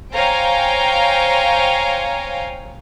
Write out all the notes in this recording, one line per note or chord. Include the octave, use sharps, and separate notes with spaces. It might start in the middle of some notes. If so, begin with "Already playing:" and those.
C5 C#5 F5 G5 G#5 A#5